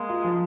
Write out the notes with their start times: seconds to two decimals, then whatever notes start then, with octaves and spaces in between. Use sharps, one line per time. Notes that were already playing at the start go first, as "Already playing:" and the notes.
Already playing: G#3 A#3
0.09 F4
0.24 F3